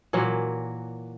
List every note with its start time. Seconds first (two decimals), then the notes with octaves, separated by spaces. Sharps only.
0.13 A#2 E3 F#3 A#3